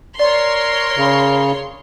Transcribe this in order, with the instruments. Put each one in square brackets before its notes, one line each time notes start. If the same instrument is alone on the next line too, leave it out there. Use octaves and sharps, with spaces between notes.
[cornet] A#4 [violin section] C#5 C6 [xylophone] D5
[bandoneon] C#3